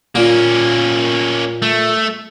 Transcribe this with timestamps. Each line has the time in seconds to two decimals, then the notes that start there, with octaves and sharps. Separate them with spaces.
0.15 A#2 A#3 C#4
1.62 A3